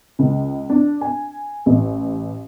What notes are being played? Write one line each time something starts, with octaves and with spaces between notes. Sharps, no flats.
C#2
D4
G#5
A1